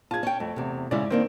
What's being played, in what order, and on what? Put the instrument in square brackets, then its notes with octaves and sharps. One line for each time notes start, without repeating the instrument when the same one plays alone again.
[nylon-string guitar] F4 G#4 [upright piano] A5 G#6
[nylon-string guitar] C#4 G5
[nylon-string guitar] F2 [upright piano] A3
[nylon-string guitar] E2 C3
[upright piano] G#2 E4 D5 [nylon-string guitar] C#3 C#4
[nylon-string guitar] D#3 A#3 D4 [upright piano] C4